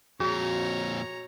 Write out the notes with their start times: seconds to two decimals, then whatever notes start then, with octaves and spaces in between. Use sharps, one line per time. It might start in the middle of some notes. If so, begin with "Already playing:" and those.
0.20 F2 A#2 F#4 G#4 C#5 A#5